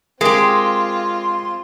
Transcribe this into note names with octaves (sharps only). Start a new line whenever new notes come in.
G#3 C4 F4 G4 A#4 C6